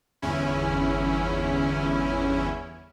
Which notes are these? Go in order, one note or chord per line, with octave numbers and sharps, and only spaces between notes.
G1 E2 C#4 E4